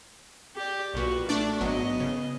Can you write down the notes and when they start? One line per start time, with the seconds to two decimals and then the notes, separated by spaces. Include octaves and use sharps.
0.56 G4 D5
0.94 B1 A#2 F#4 B4
1.29 A3 D4 A4 D5
1.61 G#1 F#3 B3 D#5
2.00 C#3